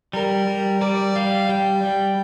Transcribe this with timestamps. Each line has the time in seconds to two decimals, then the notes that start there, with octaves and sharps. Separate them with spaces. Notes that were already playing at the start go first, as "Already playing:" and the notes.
0.13 G3 A#4
0.48 G3
0.81 G3 D5
1.15 G3 F5
1.49 G3 G5
1.84 G3